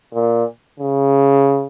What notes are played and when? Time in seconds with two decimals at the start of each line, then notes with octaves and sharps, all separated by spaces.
0.14 A#2
0.80 C#3